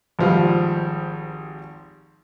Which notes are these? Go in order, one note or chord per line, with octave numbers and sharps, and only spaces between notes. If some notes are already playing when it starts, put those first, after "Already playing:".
G#1 F3 G3